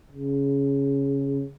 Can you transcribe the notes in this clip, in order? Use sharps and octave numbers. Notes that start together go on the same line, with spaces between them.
C#3